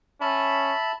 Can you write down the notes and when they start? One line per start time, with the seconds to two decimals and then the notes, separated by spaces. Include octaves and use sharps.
0.21 C#4 E5 A5 B5